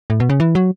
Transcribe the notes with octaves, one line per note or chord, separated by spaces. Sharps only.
A2
B2
C#3
E3
F#3